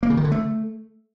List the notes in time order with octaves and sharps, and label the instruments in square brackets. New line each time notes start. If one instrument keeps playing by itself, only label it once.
[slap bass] A#3
C#3
D#3
D3
A3